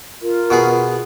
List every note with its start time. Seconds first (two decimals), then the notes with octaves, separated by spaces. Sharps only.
0.22 F4 A#4
0.50 B2 B3 G#4